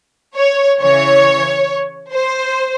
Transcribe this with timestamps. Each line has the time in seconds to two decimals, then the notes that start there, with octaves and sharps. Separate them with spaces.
0.35 C#5
0.80 C#3 E3 C#5
2.13 C5